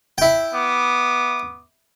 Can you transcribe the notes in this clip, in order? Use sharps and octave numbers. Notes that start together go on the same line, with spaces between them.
E4 G5
B3 D6 D#6